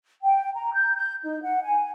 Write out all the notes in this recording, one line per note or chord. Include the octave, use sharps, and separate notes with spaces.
G5
A#5
G6
G6
D#4
F#5
G#5